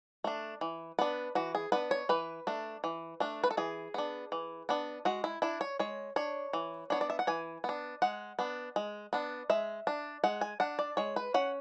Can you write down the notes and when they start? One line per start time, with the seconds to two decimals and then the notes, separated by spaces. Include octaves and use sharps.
0.24 A3 D4
0.61 E3
0.99 B3 D4 B4
1.35 E3 F#4
1.55 G#4
1.72 B3 D4 B4
1.91 C#5
2.09 E3 B4
2.47 A3 D4
2.84 E3
3.20 A3 D4
3.44 B4
3.51 A4
3.57 E3 G#4
3.94 B3 D4
4.32 E3
4.69 B3 D4
5.05 G#3 F#4
5.24 E4
5.42 D4 E4
5.61 C#5
5.79 G#3 C#5
6.16 D4 C#5
6.53 E3
6.90 B3 D4 C#5
7.01 D5
7.10 E5
7.19 F#5
7.27 E3 G#5
7.64 B3 D4
8.02 G#3 F#5
8.39 B3 D4
8.76 G#3
9.13 B3 D4
9.50 G#3 E5
9.87 D4
10.24 G#3 F#5
10.41 G#5
10.60 D4 F#5
10.79 D5
10.97 G#3 C#5
11.16 B4
11.34 C#4 F#5